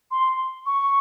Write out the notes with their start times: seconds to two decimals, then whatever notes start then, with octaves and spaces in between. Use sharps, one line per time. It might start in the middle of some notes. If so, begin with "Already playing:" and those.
0.11 C6
0.66 C#6